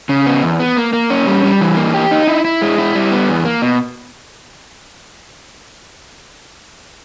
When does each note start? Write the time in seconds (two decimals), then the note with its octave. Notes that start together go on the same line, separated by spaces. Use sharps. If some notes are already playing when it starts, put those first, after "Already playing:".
0.09 C#3
0.26 B3
0.43 E2
0.60 B3
0.77 A#3
0.93 A#3
1.10 C#4
1.27 G3
1.44 G3
1.61 E3
1.77 A#3
1.94 G4
2.11 D#4
2.27 E4
2.45 E4
2.62 G#3
2.78 E4
2.95 G3
3.12 B3
3.29 E2
3.45 A#3
3.62 B2